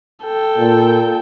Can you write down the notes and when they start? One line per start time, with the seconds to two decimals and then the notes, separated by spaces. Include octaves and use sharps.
0.24 A4 G5
0.57 A#2